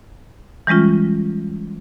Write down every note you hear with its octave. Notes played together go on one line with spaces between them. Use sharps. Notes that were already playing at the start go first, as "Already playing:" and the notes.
E3 G3 G#3 C#4 F4